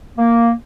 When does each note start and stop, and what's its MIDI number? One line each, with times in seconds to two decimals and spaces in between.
0.18 0.50 58